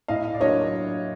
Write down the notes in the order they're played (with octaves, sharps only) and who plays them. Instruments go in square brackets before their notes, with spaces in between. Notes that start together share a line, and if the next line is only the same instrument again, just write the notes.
[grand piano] A2 [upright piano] D#5 F5
[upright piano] D5
[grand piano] F#3 A#3 D4 F4 [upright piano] C#5 D#5